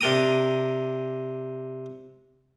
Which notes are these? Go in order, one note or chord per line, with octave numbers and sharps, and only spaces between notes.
C3 D4 A#4 G5 A#5 D#6